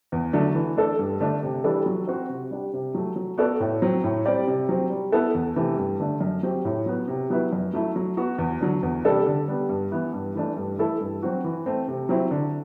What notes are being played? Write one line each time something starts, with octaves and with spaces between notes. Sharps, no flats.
E2
D3 F#3 A3
E3
A3 D4 A4
G2
D3 A3 D4
C3
E3 G3 D4 A4
F#3
C4 F#4 C5
C3
G3 D4
C3
F#3 A3
F#3
B3 F#4 A4 D5
A2
F#3 C4
A2
G3 C4 G4 D5
C3
F#3 C4
G3
B3 E4 A4
E2
C3 E3 A3
G2
D3 A3 D4
F#2
F#3 C4 G4
A2
F#3 B3
C3
F#3 B3 E4 B4
F#2
F#3 A3 E4
F#3
B3 F#4
E2
D3 F#3
E2
C3 G3 D4 A4
D3
G3 B3
G2
E3 B3 E4
G2
E3 A3 D4
G2
E3 A3 E4 A4
G2
F#3 C4 F#4
E3
A3 C4
C3
F#3 C4 E4
D3